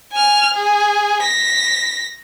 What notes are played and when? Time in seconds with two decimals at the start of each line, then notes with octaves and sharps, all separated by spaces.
0.12 G#5 F6
0.54 G#4
1.22 A#6 B6